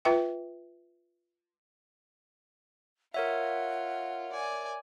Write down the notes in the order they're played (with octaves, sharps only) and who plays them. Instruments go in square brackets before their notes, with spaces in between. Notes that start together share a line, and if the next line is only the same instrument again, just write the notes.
[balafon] F4 B4 E5 G5
[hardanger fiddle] F4 [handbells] A#4 C#5 E5 [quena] F#5
[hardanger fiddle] D5 G#5